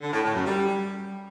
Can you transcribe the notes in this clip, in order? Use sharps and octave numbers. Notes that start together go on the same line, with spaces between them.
D3
A2
A2
F#2
G3